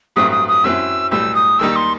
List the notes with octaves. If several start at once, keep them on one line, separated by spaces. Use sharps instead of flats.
A1 G2 F#3 A3 C4 D#6
D#6
D#6
F#2 F#3 C4 E4 E6
B1 A2 G3 E6
D#6
D#2 D#3 G3 D#4 E6
C6